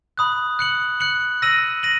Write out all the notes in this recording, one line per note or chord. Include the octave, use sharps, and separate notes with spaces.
B5 D#6 F#6
F#6 C#7 F#7
F#6 C#7 F#7
E6 A#6 D#7 F#7
A#6 D#7 F#7